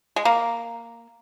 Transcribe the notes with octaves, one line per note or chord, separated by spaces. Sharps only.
G#3
A#3